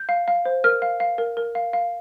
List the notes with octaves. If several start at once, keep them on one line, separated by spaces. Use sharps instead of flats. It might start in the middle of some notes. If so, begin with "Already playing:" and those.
Already playing: G6
F5
F5
C5
A#4 F6
F5
F5
A#4
A#4
F5
F5